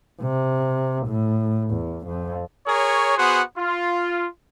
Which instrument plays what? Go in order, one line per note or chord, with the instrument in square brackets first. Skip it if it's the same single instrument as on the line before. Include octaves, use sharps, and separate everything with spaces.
[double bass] C3
A2
E2
F2
[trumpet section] G#4 A#4 C#5
B3 F#4 G#4 C5 F#5
F4